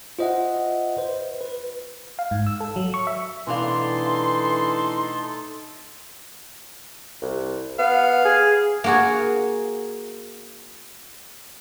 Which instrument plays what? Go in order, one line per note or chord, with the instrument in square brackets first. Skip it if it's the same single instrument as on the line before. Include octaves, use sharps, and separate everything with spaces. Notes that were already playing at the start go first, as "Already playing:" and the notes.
[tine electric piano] F4 C5 D#5 E5 F#5
B4 C5
B4
[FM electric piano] F5
G#2
E6
A4
F#3
C#6
E5
[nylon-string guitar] B2 D4 F5 [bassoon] E3 [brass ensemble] A3 D#4 A4 [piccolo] C6
[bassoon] C2
[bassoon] B3 [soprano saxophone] F5
[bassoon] G#4
[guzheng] A#3 F#4 G#4